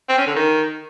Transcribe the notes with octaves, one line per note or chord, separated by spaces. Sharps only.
C4
C#4
D3
D#3